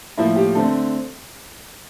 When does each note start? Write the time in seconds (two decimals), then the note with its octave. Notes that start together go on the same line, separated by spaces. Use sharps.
0.17 A2 F3 A#3 E4
0.36 G4
0.55 D3 A3 C4 A4